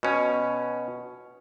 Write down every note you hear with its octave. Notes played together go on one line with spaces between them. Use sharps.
B2 C#4